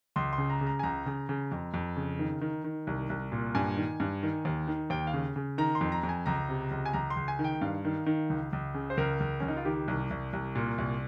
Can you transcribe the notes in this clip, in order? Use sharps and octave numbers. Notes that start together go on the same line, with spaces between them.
C#2 C6
C6
C#3
A#5
C#3
A#5
G#5
C#2 A#5
C#3
C#3
F2
F2
C#3
D#3
D#3
D#3
C2
C2
A#2
G2 G#5
D#3
G2
D#3
D#2
D#3
D#2 G5
F5
C#3
C#3
D#3 A#5
C6
F2
A#5
F2
G#5
C#2 A#5
C3
C#2
G#5
C#2 A#5
C6
C#2
G#5
D#3
G5
G2 F5
D#3
D#3
C#2
C#2
C#3
C5
C#2 A#4
C#2
C#2 C#4
D#4
F4
D#3 G4
C2
C2
C2
A#2
C2